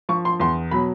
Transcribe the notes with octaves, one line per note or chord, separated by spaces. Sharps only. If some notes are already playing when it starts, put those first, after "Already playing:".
F3 C#6
C6
E2 C6
B2 F#3 B5